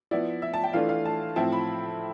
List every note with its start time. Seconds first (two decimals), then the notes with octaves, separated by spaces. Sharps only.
0.11 F3 B3 E4 D5
0.42 E5
0.54 A5
0.64 G5
0.73 E3 A3 D4 F4 F5
0.89 F5
1.06 A5
1.36 A2 F3 C4 E4 A5
1.52 B5